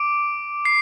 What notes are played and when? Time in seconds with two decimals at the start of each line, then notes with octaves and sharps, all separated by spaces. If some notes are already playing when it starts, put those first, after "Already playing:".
Already playing: D6 D7
0.65 C7